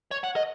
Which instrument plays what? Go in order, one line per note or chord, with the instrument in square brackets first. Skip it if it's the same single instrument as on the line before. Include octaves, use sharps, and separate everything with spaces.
[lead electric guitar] C#5
F#5
D#5